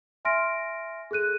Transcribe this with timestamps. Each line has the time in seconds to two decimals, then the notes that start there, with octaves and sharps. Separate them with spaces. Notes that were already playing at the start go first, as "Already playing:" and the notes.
0.25 E5 G#5 C6 F6 A#6 D7
1.11 G#4 A4 F#6 D#7